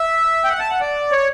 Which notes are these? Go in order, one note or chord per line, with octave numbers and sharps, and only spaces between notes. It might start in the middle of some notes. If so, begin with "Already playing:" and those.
Already playing: E5
G5
F#5
A5
F#5
D5
C#5